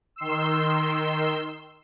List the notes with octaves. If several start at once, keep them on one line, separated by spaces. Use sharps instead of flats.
D#3 C6 E6